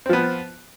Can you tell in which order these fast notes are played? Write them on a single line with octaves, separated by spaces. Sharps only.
C4 F3 B3